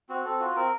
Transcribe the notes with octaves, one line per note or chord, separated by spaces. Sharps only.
C4 F#4
C4 A4
F4 F#4
C4 A#4